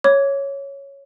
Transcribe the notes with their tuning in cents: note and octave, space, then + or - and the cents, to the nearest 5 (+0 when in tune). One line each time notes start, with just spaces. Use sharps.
C#5 +0 D6 -25